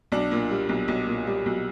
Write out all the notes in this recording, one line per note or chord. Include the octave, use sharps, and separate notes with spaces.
B1 D4
A#2
G3
B1
B1
A#2
G3
B1